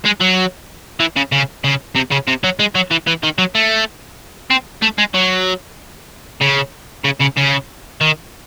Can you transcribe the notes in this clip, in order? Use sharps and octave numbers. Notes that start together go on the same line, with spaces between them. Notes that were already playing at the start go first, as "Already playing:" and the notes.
G#3
F#3
E3
C#3
C#3
C#3
C3
C#3
C3
F#3
G#3
F#3
E3
E3
D#3
F#3
A3
C4
A3
G#3
F#3
C#3
C#3
C#3
C#3
D#3